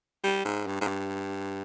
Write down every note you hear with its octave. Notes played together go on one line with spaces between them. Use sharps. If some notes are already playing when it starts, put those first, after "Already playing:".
G3
G#2
G2
G#2
G2